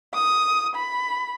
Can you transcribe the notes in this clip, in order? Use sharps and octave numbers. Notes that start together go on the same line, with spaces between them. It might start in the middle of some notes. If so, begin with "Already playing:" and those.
D#6
B5